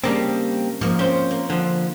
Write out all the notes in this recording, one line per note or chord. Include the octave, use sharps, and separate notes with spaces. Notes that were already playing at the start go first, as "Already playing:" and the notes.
C#3 G3 A#3 C4 D4
G#2 F3 A#3
C4 C#4 C5
A#3
D3 F3 C4